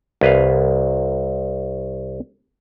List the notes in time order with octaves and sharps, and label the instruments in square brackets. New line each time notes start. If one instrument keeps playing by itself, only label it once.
[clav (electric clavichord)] C2 B4 F5